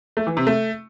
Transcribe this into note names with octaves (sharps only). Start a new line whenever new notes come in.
A3
E3
C3
A3